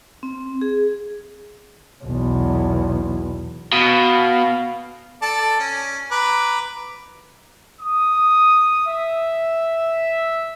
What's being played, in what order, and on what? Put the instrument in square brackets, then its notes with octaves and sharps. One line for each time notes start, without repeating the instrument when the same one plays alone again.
[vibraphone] C4
G#4
[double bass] B1 E2
[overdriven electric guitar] B2 [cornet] F5
[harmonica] A4 D5 A5
C#4
B4 A#5 D6
[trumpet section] D#6
E5